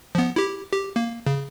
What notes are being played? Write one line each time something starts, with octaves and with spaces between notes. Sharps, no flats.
F3 B3
E4 G4
G4
A#3
C#3